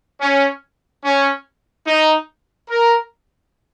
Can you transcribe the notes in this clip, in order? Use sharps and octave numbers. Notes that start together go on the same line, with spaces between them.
C#4
C#4
D#4
A#4